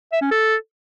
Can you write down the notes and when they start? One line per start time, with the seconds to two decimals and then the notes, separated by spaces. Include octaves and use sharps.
0.12 E5
0.22 C#4
0.31 A4